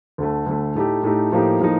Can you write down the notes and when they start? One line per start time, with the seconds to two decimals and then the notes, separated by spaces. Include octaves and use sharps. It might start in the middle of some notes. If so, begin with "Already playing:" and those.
0.18 D2 D3 A3
0.46 D2 D3 A3
0.75 A2 A3 D#4 G4
1.03 A2 A3 D#4 G4
1.32 A2 F3 A#3 D#4 G4
1.60 A2 F3 A#3 D#4